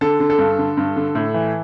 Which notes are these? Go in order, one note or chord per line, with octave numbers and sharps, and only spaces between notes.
D3 A4
D3
A4
G2
D3
G2
D3
A2
E3